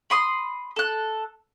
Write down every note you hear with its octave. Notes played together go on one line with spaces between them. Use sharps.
B5 C6 D#6
A4 F#6